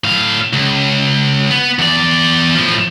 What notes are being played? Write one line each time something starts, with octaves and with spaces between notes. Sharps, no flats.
A2 F5
C#2
B3
E2 D5
A2 F3